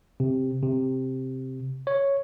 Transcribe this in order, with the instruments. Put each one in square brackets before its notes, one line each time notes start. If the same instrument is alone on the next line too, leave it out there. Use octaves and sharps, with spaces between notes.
[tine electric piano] C3
C3
C#5